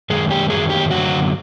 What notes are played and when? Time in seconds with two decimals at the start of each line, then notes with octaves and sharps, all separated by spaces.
0.10 F#2 D#3 G#3 G#4
0.30 G4
0.50 F#2 D#3 F#3 G#4
0.70 G4
0.91 F#2 D3 F#3 F#4